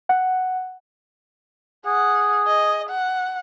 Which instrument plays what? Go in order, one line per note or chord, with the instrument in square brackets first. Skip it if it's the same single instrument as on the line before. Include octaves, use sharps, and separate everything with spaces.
[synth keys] F#5
[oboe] G#4 [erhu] F#5
[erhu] D#5
F#5